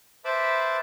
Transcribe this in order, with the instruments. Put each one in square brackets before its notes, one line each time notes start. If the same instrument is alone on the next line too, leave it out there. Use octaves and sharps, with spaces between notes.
[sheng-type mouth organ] B4 C5 E5 A5 B5 D6